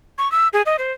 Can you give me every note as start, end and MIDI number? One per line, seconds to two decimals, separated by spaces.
0.18 0.30 85
0.32 0.48 88
0.53 0.62 68
0.66 0.76 75
0.79 0.92 72